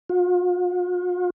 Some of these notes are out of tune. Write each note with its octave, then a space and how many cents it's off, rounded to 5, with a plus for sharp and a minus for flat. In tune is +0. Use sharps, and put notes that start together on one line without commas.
F4 +45